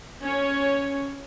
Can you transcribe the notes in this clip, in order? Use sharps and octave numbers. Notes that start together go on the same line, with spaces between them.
C#4 C#5